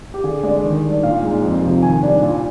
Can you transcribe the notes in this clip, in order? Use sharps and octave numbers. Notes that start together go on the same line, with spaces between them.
G4
D3 G#4
G#3 D4 D5
D#3
G3 D4
A#2 F5
G#3 D#4
F2
C3 F3
D#3 G#5
G3 D4
A#2